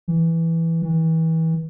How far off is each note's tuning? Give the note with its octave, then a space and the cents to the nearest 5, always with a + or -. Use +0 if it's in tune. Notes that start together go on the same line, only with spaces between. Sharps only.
E3 +0
E3 -30